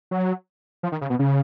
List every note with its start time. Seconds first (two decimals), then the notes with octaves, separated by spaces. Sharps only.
0.11 F#3
0.83 F3
0.92 D#3
1.01 C#3
1.10 B2
1.19 C#3